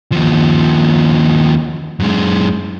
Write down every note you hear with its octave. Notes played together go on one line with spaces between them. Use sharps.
D#2 F3
F#2 G#3